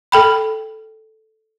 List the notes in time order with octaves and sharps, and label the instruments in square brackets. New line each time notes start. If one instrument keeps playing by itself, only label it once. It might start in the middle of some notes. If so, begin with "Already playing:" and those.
[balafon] A4 G5 B5